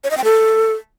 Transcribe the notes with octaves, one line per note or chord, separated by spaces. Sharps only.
C#5
D#5
G5
A4